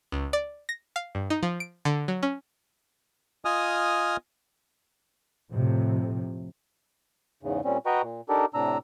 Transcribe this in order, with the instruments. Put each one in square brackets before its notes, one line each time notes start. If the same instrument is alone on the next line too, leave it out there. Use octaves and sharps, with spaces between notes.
[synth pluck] C#2
D5
A#6
F5
G2
D#4
F3
D7
D3
F#3
C#4
[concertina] F4 D#5 G#5 D#6 F6
[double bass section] F2 A2 C3
[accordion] E2 G#2 C#3
A#2 G3 C4 C#4
F#4 B4 D#5 G5 A#5 C#6
A#2
D4 D#4 G4 A4 A#4
A2 C3 D4 A#5 E6